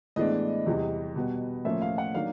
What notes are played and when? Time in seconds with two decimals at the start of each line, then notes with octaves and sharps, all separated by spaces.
0.16 A2 E3 G#3 B3 D4 D#5
0.66 E2 C3 E3 G3
1.16 B2 G3 B3
1.65 A2 F3 A#3 C#4 E5
1.82 F5
1.98 F#5
2.15 D#3 F#3 A#3 D4 F5